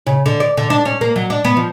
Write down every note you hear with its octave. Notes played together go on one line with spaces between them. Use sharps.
C#3
D3
D5
D3
D4
C#4
A#3
F#3
D4
B3
F3